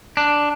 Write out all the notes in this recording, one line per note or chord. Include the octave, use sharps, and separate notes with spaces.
D4